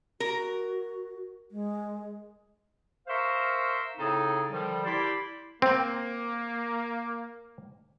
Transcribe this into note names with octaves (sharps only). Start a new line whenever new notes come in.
F#4 A#4
G#3
A#4 C5 E5 F5 C6 C#6
A2 C#3 C4 D#4 G#4 A4
D3 D#3 F3 G3
E4 G4 D5 A5 B5 C6
A#3 C4